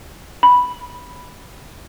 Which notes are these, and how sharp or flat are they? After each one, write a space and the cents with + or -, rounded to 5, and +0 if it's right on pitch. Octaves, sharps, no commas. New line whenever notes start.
B5 -5